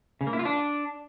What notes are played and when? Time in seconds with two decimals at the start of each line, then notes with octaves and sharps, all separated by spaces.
0.21 C#3
0.27 A#3
0.33 E4
0.39 F4
0.45 D4